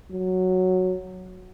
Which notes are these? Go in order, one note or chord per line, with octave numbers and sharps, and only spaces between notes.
F#3